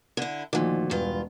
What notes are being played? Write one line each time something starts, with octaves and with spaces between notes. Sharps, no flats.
D3 E4
D2 A#2 D#3 F3
E1 G2 F4